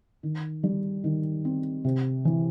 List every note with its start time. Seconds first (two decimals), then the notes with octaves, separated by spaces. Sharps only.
0.23 D#3
0.63 G3
1.04 D#3
1.45 C4
1.84 C3
2.25 E3